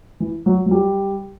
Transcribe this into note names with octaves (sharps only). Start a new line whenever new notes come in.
E3
F#3
F#3
G3